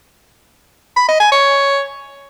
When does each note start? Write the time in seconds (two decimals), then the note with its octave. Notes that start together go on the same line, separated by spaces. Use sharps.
0.96 B5
1.08 D#5
1.20 G#5
1.32 C#5